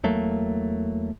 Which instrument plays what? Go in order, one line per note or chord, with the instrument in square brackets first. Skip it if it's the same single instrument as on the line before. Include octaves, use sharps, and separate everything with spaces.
[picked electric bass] E2 F#3 A3 A#3